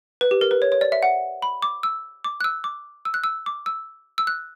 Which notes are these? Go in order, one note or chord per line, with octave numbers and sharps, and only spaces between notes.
B4
G4
A#4
B4
C#5
C#5
D5
E5
F#5
B5
D6
E6
D6
F#6
E6
D6
E6
F#6
E6
D6
E6
E6
F#6